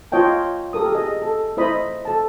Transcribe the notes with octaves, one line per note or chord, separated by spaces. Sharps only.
F4 C#5 D#5 G5 A5
G4 A4 A#4 D#6
G#4 D#5
A4
E4 C5 D#5 B5
A4 A5